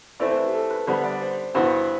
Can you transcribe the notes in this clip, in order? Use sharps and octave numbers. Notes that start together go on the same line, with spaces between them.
E3 A3 C4 E4 D5
C5
B4
G4
A4
B4
D3 G3 B3 C5
D5
C5
G2 E3 B3 F#4 C5